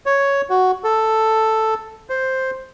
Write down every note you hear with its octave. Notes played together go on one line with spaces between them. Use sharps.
C#5
F#4
A4
C5